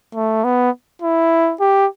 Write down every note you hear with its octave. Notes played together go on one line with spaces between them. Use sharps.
A3
B3
E4
G4